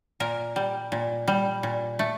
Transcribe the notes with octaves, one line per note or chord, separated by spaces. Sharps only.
A#2 A#4
G3
A#2
G3
A#2
A3